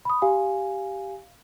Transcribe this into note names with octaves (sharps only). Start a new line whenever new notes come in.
B5 D#6
G4 F5 G#5